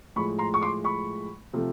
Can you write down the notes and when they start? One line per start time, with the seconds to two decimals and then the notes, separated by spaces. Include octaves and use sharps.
0.16 A2 F3 G#3 B5 C#6
0.38 A#5 C6
0.54 C#6
0.61 C6 D6
0.84 B5 C#6
1.53 C3 F3 A3